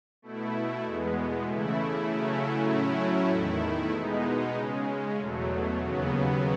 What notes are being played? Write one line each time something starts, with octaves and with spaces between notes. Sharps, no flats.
B2 A3 E4
E2 B2 G#3 B3
C#3 E3 A3 E4
C#3 F#3 A3 C#4 E4
A2 F#3 A3 C#4 E4
E2 D#3 A3 E4
B2 G#3 B3 D#4
C#3 G#3 C#4
E2 B2 F#3 A3
D#2 C#3 F#3 B3